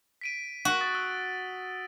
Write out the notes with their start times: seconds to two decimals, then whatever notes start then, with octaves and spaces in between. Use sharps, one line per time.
0.21 B6 D7 D#7
0.65 F#4
0.81 D#6 A6
0.95 E6